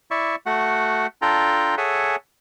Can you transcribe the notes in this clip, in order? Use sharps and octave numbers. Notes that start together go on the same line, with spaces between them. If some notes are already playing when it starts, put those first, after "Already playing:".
E4 D5 E5 C#6
A3 F#4 F#5
D4 F4 A4 G5 A#5
G#4 A4 C#5 E5 F#5 G#5